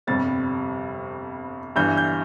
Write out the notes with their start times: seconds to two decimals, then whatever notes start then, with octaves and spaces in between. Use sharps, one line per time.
0.07 G1 F2 C3 G3 A6
1.76 G1 G2 E3 G6
1.97 G6